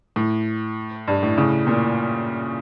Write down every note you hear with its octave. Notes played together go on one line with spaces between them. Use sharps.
A2
G2
A2
A2 C#3
A#2